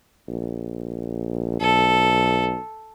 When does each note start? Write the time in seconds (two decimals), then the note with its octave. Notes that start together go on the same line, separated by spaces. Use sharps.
0.28 A#1
1.61 B1 A4